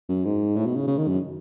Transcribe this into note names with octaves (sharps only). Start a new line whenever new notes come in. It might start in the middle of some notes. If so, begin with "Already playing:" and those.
F#2
G#2
A2
B2
C#3
C#3
D#3
F#2